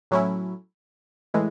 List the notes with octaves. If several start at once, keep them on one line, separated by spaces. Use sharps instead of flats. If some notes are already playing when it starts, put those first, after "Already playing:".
A2 F#3 C#4 E4
A2 E3 G#3